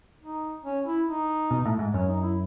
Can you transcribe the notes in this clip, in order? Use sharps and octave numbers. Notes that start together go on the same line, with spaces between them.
D#4
C#4
E4
D#4
B2
A2
G#2
F#2 C#4
D#4
E4